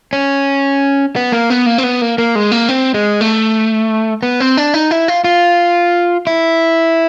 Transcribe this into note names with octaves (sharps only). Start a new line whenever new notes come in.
C#4
B3
A#3
B3
A#3
C4
B3
A#3
A#3
G#3
A#3
C4
G#3
A3
B3
C4
D4
D#4
E4
F4
F4
E4